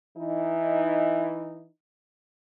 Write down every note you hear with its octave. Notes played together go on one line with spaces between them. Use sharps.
E3 D#4